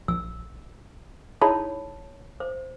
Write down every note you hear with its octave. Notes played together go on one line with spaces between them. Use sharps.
A#1 E6
D#4 E4 G#4 C#5 A5 B5
C5